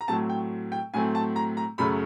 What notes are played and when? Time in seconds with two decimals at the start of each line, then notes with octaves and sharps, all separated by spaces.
0.01 A#5
0.08 A2 F#3 A3 C4 A5
0.29 G5
0.72 G5
0.94 A2 F#3 A3 C4 G#5
1.15 A5
1.36 A#5
1.57 A#5
1.78 F#2 C#3 F#3 A3 C#4 B5